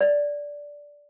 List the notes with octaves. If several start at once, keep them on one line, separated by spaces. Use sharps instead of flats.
D5